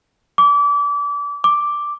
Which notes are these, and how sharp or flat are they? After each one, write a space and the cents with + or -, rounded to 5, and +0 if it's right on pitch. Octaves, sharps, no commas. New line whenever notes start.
D6 -30
D6 +0